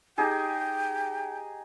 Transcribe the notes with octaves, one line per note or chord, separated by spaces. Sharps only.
D#4 G4 G#4 G5